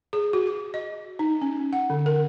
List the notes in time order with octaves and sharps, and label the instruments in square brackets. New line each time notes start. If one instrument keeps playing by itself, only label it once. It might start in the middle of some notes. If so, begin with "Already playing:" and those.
[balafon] G#4
F#4
D6
D#5
D#4
C#4
F#5
D3
A#4